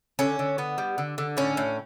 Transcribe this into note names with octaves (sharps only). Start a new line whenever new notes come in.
D3 C#4
D3
B3
G3
D3
D3
A2 C#4
A2